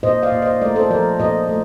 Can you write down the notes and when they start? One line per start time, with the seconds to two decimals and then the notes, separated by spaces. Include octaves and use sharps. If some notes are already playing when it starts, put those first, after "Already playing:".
0.03 A#2 C5 D#5
0.23 D5 F5
0.32 A#2
0.42 C5 D#5
0.61 A3 A#4 D5
0.76 A4 C5
0.90 F3 A#4 D5
1.20 A#2 C5 D#5
1.49 A3